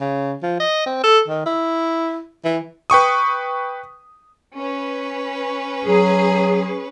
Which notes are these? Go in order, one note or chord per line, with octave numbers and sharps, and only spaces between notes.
C#3
F3
D#5
C4
A4
D#3
E4
E3
B4 G5 C#6 D#6
C#4 B4
F#3 G#4